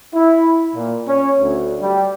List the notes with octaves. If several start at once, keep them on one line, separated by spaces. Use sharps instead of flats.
E4
A#2
C#4
D2
G3